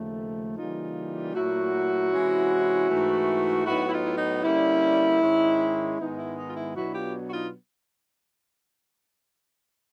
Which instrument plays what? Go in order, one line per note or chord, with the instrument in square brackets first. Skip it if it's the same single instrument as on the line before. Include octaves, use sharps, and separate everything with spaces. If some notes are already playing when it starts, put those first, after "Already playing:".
Already playing: [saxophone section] D#2 C#3 F3 A3
C#3 E3 G3 A#3 D#4 F4
A#2 F#3 A3 E4 F#4
C3 E3 G#3 C#4
G#2 E3 A3
A2 F#3 B3 D#4 E4 F#4
E4
D#4 F4
E4
D#4
D3 G3 A#3 C#4 E4
G#2 D#3 G#3 C#4
G#2 D#3 G#3 B3 D#4
E4
D#4
F4
E4
B2 F#3 B3 D4 E4 F#4
F4 G4
F#4
D#4 F4